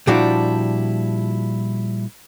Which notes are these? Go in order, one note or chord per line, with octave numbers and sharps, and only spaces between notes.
A#2 F3 G3 D4 E4 F#4